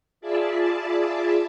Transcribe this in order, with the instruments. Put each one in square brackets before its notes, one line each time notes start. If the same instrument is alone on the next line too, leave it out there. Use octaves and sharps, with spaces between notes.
[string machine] F4 G#4 D5 E5 A5 B5